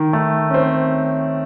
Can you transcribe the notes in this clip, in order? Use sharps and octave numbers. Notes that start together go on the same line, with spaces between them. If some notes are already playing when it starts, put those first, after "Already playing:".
Already playing: D#3
A3
C#4
C4